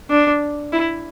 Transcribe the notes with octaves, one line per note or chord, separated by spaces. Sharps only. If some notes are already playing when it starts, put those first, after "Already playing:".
D4
E4